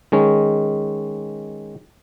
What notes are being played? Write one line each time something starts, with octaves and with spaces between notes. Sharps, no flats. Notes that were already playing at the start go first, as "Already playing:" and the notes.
D#3 G#3 C#4